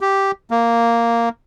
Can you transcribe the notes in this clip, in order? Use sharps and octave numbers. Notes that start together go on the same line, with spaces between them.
G4
A#3